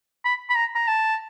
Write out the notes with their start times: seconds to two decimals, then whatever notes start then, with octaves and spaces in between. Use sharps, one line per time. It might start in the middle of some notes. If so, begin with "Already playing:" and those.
0.25 B5
0.50 B5
0.56 A#5
0.75 A#5
0.88 A5